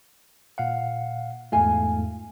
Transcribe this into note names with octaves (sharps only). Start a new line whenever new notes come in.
A#2 F5 F#5
E2 G#2 A3 F4 G#5